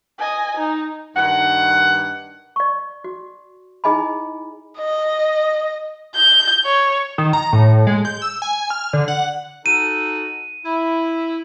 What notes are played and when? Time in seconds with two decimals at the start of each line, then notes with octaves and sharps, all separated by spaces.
0.18 D#5 G#5
0.57 D#4
1.16 G2 D#3 F#5
2.56 D5 C#6
3.04 F#4
3.84 D#4 E4 G#4 D#5 G#5 B5
4.78 D#5
6.15 G6
6.65 C#5
7.18 D#3
7.33 A#5
7.53 A2
7.87 G#3
8.05 G6
8.22 E6
8.42 G#5
8.70 F6
8.93 D3
9.08 F#5
9.66 D#4 F#4 A4 D#7
10.65 E4